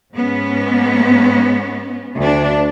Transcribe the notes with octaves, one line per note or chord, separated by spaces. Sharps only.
G#2 B3 C#4
D2 D4